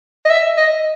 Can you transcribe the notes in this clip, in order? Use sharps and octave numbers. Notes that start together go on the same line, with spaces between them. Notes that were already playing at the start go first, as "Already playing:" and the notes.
D#5
E5
D#5